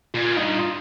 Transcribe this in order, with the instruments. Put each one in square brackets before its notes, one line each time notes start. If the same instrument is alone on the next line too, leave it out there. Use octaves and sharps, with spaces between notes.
[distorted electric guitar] A#2 [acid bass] F4
[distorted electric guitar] G2 [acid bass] D#4
[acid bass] F4